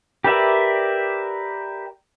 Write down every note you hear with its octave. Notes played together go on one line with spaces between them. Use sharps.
G4 A#4 B4 D5 E5